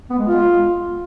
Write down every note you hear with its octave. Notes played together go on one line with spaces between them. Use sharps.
B3
G#3
F4